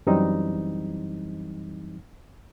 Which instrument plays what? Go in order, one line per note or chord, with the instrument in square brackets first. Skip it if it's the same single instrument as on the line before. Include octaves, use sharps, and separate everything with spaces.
[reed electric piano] F#2 E3 G3 C4 D#4